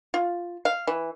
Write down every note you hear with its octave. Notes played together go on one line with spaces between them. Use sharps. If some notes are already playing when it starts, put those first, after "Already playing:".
F4
F5
E3